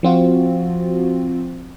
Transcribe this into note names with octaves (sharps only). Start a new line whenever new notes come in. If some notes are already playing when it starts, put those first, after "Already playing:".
F3 C4 F4 F#4